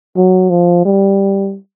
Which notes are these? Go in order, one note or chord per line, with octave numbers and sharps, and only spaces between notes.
F#3
F3
G3